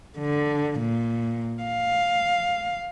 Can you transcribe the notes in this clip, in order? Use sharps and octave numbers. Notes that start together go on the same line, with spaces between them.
D3
A#2
F5